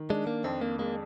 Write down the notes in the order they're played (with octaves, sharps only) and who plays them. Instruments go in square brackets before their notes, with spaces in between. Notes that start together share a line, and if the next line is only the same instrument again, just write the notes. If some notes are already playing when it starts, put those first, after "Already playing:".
Already playing: [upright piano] D#3
[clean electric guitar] G#3 [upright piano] D4
[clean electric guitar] A#3
[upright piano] F2 [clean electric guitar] C4
[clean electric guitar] A#3
[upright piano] G#3 [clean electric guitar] A#3